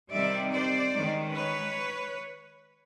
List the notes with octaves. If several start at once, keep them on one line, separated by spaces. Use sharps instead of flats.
C3 D#3 G3 C4 D5 E5
C5 D5
D#3 G#3 C#4
B4 C#5